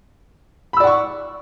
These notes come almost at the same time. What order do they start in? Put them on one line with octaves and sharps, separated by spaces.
B5 E6 D5 F#5 C#6